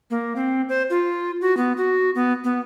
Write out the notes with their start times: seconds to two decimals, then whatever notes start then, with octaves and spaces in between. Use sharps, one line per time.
0.11 A#3
0.36 C4
0.69 C5
0.90 F4
1.41 F#4
1.57 B3
1.77 F#4
2.15 B3
2.44 B3